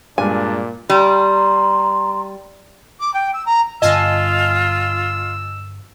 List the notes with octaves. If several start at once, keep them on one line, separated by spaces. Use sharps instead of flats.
G2 A#2 G#3 D4 G#5
G3 A#5 C6
D6
G5
E6
A#5
G1 G2 D3 F4 D#5 G#5 A5 E6